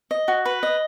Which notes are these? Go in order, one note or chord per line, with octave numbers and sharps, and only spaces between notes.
D#5
F#4
B4
D#5